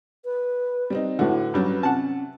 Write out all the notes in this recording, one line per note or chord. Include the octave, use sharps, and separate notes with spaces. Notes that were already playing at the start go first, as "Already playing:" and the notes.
B4
G3 C4 D#4
A2 D3 E4 F#4 B4
G2 F#3 G3 C#4
C3 C#4 F#5 A5